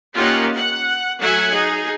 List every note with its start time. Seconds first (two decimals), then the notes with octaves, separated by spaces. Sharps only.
0.15 A#3 C#4 D#4 F4 G4 F#5
0.53 F#5
1.19 F#3 A3 E5 F#5 G#5
1.51 D#4 G#4